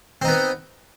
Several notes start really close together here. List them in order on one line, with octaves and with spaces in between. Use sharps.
C4 D#4 B3